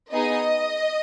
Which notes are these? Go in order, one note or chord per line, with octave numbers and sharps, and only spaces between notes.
B3 D#4 G#4 D#5